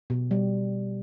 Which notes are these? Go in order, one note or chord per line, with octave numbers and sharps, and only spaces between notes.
B2
G3